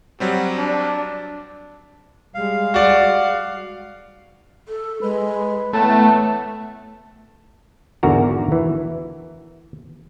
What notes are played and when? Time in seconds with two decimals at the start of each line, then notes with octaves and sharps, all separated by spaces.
0.20 F#3 G3 C4 F#4
0.57 D4
2.34 G3 G#3 F5
2.74 F#4 D5
4.68 A4
5.02 G#3 B4
5.73 A2 E3 A3 B3 F#5 A5
8.03 E2 G#2 D3 F#4 A#4 A#5
8.52 E3